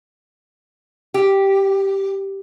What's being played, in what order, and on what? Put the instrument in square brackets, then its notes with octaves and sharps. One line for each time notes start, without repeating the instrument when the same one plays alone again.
[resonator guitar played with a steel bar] G4